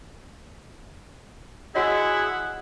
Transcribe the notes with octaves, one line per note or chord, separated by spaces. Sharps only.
E4 F#4 G#4 C#5 D#5 F#5